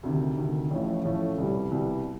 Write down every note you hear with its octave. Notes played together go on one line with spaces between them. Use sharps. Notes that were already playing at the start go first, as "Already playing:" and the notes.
D2 C3 D#3
D2 C3 D#3
A1 A2 F3 A3 C#4
A1 A2 F3 A3 C#4
C2 B2 G3
C2 B2 G3